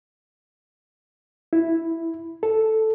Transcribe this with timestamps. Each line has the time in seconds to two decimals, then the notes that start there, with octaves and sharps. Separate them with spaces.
1.53 E4
2.43 A4